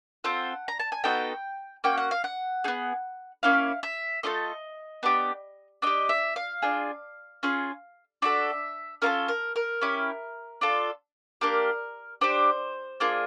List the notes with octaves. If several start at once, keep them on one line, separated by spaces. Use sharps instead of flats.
C4 F4 A4 F#5
A#5
A5
G#5
B3 D#4 F#4 A4 G5
A#3 C#4 F#4 G5
F#5
F5
F#5
B3 D#4 G#4
A#3 C#4 E4 F5
E5
A3 D4 F4 A4 D#5
B3 D4 G4
D4 G4 D#5
E5
F5
D4 F4 G#4
C#4 F4 G#4
D4 F#4 A4 E5
C#4 F4 A4 A#4
A#4
A#4
C#4 E4 G4
D4 F4 A4
A#3 D4 G4 A#4
D4 G4 C5
A#3 D4 F4 G#4